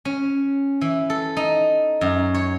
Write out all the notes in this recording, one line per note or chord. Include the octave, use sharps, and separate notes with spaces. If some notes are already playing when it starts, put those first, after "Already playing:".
C#4
E3
A4
D#4
F#2
C#5